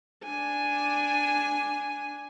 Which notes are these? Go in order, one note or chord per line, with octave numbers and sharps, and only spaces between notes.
D4 G#5